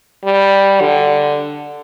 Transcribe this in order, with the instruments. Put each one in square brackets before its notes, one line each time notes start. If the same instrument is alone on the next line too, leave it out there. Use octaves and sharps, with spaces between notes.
[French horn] G3
D3